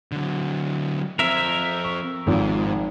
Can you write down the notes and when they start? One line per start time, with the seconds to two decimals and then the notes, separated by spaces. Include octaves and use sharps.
0.12 D3 F#3
1.19 F3 C4 A#4 E5
1.84 C#6
2.27 G#1 G#2 D#3 F3